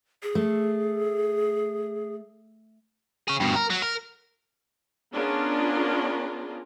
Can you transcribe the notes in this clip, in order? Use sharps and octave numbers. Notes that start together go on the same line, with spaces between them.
G#4
A3
G#4 C#5
G2 B2
A#4
F#3
A#4
B3 C#4 D4 F4 G#4 A#4